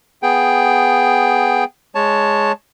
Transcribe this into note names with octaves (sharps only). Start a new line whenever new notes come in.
B3 G#4 G5
G#3 C#5 A5